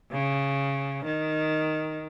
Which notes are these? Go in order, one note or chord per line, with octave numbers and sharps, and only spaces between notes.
C#3
D#3